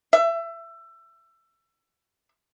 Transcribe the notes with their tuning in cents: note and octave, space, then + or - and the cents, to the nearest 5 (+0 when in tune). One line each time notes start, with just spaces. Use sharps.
E5 +25